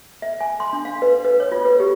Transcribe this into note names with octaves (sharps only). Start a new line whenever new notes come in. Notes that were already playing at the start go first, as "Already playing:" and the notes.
E5
G#5
C6
D4
F5
B4
B4
C#5
F4
B4
G4